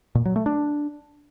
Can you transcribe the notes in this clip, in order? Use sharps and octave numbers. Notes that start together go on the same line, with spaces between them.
A#2
F#3
A3
D4